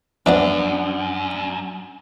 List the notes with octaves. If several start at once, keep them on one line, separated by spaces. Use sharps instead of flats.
F#2 E3 F3 B3 D4